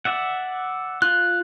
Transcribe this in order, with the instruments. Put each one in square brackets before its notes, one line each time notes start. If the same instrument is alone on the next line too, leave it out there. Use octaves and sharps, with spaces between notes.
[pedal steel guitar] D5 E5 F#5
[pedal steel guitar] F4 [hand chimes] F#6